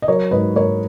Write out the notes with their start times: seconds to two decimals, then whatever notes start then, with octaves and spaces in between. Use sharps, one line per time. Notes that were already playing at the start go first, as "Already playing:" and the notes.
0.02 D#5
0.08 F#3 A#4 C#5
0.31 G#2 B4 D#5
0.56 G#2 A#4 C#5